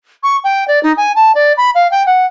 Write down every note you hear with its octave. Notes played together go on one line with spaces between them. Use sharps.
C#6
G5
D5
D#4
G#5
A5
D5
B5
F5
G5
F#5